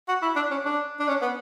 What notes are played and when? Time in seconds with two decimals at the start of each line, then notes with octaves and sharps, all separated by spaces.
0.08 F#4
0.22 E4
0.36 D4
0.51 C#4
0.65 D4
0.99 D4
1.08 C#4
1.22 B3